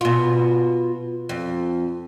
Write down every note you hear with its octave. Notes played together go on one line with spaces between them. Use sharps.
B2 F4
F2